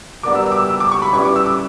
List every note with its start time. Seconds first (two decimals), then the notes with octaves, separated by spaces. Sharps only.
0.23 G3 B3 D4 A#4 D6
0.35 E6
0.46 E6
0.52 D6
0.57 E6
0.69 E6
0.80 D6
0.91 C#6
1.02 B5
1.13 G3 C#4 E4 G4 B4 C#6
1.25 D6
1.36 E6
1.46 D6